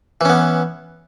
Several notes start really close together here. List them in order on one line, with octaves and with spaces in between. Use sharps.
E3 C#4 B3